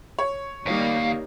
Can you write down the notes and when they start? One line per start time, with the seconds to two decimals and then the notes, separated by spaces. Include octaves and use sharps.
0.19 C#5
0.66 D#2 G3 A#3 D#4 F5